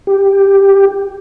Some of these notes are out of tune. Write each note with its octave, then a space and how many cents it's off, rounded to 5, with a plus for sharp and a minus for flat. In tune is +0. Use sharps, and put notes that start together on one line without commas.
G4 +5